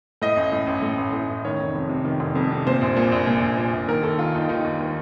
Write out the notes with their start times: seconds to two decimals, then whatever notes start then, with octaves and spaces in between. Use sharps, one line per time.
0.22 A2 D#5
0.37 A1
0.52 A2
0.67 A1
0.82 A2
0.98 A1
1.13 A2
1.29 A1
1.45 D#3 C#5
1.59 F1
1.75 F2
1.89 C3
2.04 D#3
2.20 F1
2.35 F2
2.51 C3
2.67 A#2 C5
2.81 A#1
2.97 A#2
3.12 A#1
3.27 A#2
3.42 A#1
3.57 A#2
3.73 A#1
3.88 D#3 A#4
4.03 D#2 A4
4.18 D#3 F4
4.34 D#2 D#4
4.49 D#3 D#4
4.64 D#2
4.81 D#3